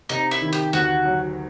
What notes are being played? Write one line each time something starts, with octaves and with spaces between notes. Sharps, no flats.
C3 D#4
E4
D#3
G4
D2 F#4
F#3